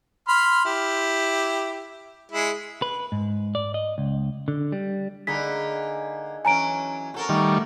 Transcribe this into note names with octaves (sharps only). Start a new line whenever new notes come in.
B5 C6 F6
E4 G4
G#3 E4
B4
G#2
D5
D#5
C#2
D3
G3
D3 A#3 D#4 G#4 B5 B6
E3 F#3 C#4 G#5 A#5 D7
F2 F#4 A4 A#4
D#3 G3 A3 C#6 D6